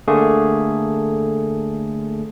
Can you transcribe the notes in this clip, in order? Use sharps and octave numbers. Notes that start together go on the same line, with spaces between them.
D3 A3 A#3 G#4